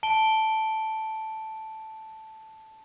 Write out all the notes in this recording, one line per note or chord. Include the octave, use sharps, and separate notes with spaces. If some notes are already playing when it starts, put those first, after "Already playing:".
A5 D7 G7